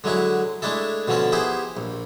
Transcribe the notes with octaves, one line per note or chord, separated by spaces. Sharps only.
D3 F#3 G#3 E4 F#4
G#3 A3 D4 E4 A4
B2 D3 F3 C#4 A4
B3 E4 G4 G#4 C5
A#1